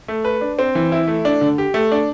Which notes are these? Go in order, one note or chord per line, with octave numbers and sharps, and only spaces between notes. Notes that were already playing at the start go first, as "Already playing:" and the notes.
A3
B4
D4
C4
E3
E4
A3
D4
D3
G4
A3
D4